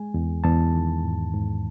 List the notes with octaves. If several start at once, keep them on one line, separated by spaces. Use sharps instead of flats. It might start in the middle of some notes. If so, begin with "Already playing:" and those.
Already playing: G#3 G#5
E2
E2 A5
D#3
G#2
G#2